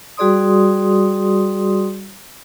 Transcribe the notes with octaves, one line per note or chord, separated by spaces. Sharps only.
G3 F#4 G#4 D5 C6 D#6